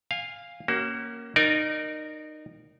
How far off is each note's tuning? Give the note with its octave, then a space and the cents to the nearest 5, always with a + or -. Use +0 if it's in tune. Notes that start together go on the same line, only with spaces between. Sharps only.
F5 +0 G#5 -25
A#3 +0 C#4 +0 F#4 +30
D#4 -25 A#4 +0 D5 +0